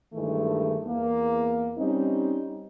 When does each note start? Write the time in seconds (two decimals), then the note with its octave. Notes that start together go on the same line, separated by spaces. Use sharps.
0.13 G2 D#3 E3 G#3 A3
0.86 E2 A#3
1.78 G3 C4 C#4 D#4